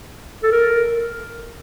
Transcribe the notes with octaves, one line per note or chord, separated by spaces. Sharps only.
A4
A#4